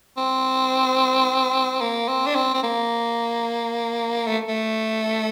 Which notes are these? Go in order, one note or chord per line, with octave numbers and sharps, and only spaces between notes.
C4
A#3
C4
D4
C4
C4
A#3
A3
A3